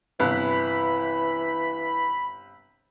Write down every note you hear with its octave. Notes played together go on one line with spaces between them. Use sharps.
G1 C3 E3 B5 F#6